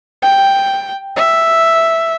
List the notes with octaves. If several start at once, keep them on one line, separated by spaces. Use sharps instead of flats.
G5
E5